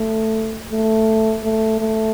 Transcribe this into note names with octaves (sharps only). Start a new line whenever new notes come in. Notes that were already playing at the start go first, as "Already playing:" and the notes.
Already playing: A3
A3
A3
A3